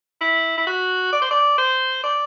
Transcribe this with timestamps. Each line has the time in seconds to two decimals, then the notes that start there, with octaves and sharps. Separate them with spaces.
0.21 E4
0.58 E4
0.67 F#4
1.13 D5
1.22 C5
1.31 D5
1.58 C5
2.04 D5